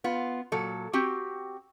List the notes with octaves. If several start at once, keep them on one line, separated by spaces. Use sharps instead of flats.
B3 F4
A#2 F#3 A4
C4 F#4 G4